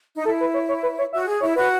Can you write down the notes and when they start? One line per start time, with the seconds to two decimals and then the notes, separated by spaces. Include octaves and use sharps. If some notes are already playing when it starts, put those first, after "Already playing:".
0.16 D#4
0.25 E4 A4
0.41 B4
0.54 C#5
0.69 C#5
0.83 B4
0.98 C#5
1.12 F#4 E5
1.26 G#4
1.40 E4 C#5
1.56 F#4 B4